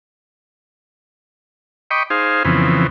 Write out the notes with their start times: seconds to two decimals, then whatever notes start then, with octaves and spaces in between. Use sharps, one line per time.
1.91 D#5 G5 B5 C#6 D6
2.10 D#4 G#4 C5 F5
2.45 F2 C#3 E3 B3 C4